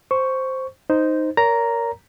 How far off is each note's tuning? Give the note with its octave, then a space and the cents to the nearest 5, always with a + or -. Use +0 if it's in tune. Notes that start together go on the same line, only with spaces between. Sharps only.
C5 +0 C#6 +5
D#4 +0 C5 -5
A#4 +0 C#5 +35 A#5 +0